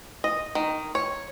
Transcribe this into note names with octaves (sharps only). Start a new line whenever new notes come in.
D#5
D#3
C#5